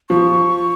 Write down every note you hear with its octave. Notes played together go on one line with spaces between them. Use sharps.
F3 C#6